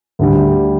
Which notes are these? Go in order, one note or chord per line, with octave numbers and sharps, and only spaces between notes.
D2 D3 G3